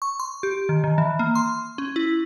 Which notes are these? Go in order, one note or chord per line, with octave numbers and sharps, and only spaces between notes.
C#6
C6
G4
D#3
D#3
E3
A#3
C6
C#4
E4